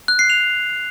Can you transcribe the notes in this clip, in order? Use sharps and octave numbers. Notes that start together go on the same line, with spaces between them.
F#6
C7
F7